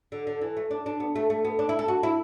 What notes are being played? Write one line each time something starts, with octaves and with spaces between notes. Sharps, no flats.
D3
D3
E3
A3
D4
D4
B3
A3
A3
B3
D4
E4
A4
F#4
E4